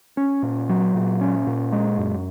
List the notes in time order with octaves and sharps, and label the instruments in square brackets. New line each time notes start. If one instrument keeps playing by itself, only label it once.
[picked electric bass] C#4
A#2
F#3
A#2
C#4
A#2
G#3
F#2